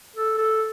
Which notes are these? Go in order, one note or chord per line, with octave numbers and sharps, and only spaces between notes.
A4
A4